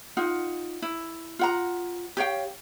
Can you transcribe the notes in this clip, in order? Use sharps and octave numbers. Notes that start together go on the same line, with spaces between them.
D#4 F4 F#5
E4
F4 F#5 A#5
G4 C#5 F5 G5